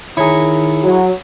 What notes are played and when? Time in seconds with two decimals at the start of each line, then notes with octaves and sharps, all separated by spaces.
0.17 D#3 E4 G#4 C#5 A#5 C#6
0.83 F#3